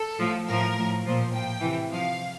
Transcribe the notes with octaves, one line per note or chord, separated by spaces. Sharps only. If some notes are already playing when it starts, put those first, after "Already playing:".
Already playing: A4
A2 F3
A2 F3 A#4
A2 F3
A#2 F3 C5
A2 F3 G5
C3 E3
C3 F3 F5